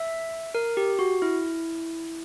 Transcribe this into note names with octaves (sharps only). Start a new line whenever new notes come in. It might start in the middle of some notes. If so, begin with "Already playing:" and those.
Already playing: E5
A#4
G4
F#4
E4